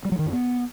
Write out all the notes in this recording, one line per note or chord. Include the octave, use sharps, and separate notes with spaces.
G3
F#3
D#3
F#2
B3